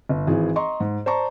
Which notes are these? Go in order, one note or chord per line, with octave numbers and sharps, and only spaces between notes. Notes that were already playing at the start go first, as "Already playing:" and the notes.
G1
G#1 E3 G#4
D#5 A#5 C6 C#6
G#2
C5 D5 A5 A#5 C#6